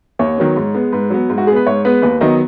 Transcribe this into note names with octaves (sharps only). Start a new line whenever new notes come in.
D#2 C#5
D#3 F#3 B3
G#2
G#3 B3
G#2 B4
F#3 B3
G#2
F#4
G#3 B3 G#4 B4
G#2 C#5
G#3 B3 B4
D#2 B4
D#3 F#3 B3 D#5